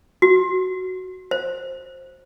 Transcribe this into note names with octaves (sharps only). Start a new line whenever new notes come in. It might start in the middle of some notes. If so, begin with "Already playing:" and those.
F#4
C5